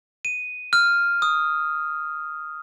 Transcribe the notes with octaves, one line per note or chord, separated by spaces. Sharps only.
D#7
F6
D#6